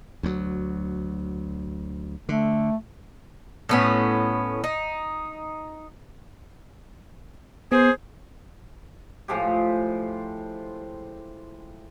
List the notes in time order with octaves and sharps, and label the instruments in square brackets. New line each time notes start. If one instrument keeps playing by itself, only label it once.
[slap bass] D2 F#3
[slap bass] D3 [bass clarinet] A3
[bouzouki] A2 B3 C#4
D#4
[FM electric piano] B3 [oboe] G#4 [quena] C5
[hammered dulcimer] A2 F3 G#3 G4